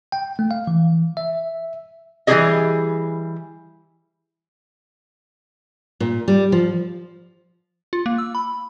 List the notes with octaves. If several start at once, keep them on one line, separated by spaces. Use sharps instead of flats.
G5
A3
F5
E3
E5
E3 G3 D#4 G4 G#4 D#5
A#2
G3
F3
F4
A#3
E6
B5